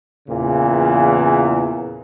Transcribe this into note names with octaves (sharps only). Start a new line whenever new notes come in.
E2 A#2 C#3 E3